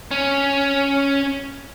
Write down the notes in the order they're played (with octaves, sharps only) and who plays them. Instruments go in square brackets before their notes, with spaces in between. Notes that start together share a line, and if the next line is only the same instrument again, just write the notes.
[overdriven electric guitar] C#4